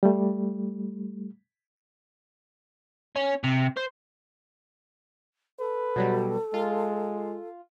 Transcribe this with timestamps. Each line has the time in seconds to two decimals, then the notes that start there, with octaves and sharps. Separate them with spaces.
0.03 G3 A3
3.16 C#4
3.44 C3
3.77 C5
5.59 A4 B4
5.96 B2 F#3 G3
6.54 G#3 F4